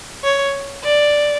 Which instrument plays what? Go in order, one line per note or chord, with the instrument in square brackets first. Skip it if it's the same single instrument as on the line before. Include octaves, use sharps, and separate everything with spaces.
[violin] C#5
D5